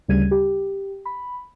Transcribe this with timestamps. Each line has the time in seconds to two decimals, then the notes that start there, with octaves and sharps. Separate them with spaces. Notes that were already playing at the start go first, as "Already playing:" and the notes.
0.08 D2 C#3 G3 G#6 D#7
0.31 G4
1.05 B5